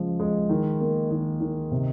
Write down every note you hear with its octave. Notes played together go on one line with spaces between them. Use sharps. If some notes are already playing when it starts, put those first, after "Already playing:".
Already playing: C#3 F3 G#3
G#3
D#3
A#3
D#3
D#3
C3